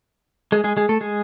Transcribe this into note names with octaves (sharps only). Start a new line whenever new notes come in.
G#3 G#4
G#3 G#4
G#3 G#4
A3 A4
G#3 G#4